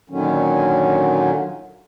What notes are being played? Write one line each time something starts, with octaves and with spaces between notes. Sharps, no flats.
A#2 D3 D#3 F#3 C#4